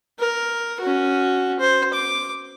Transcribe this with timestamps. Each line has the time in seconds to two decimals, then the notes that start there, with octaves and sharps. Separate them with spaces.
0.19 A#4
0.80 C#4 F#4
1.60 C5
1.94 D6